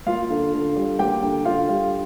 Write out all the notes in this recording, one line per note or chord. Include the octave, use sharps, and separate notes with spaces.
A#3 F4 F5
D3
D3
G3
A#3 G4 G5
D3
D3 F4 F5
G3